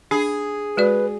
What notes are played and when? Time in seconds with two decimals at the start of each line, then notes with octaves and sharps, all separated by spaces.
0.11 D4 G#4
0.77 G#3 F#4 B4 D5